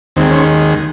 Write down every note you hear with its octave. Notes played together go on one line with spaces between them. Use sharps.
D#2 D#3 G#3 C4
C#4